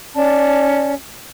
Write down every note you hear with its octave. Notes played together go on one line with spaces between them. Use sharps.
C#4 D5 A5